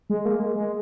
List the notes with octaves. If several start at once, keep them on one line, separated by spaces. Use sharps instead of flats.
G#3
A#3
G#3
G#3